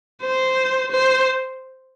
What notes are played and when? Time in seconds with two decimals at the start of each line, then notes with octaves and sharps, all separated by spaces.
0.22 C5
0.91 C5